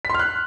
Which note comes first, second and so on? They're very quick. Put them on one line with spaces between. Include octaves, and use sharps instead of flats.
B6 C6 F6 F#6